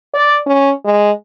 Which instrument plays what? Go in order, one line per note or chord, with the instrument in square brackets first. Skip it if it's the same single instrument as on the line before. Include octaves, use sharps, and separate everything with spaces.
[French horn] D5
C#4
G#3